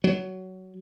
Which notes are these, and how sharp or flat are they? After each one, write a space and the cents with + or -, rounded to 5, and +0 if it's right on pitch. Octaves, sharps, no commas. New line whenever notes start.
F#3 +15